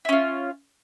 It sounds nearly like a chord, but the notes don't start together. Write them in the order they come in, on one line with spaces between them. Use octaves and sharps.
E4 C#4 F4